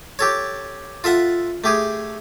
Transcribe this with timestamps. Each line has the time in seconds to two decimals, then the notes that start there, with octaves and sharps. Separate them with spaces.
0.19 G4 A4 C#5
1.04 F4 A4 E5 F#5
1.64 A3 G4 G#4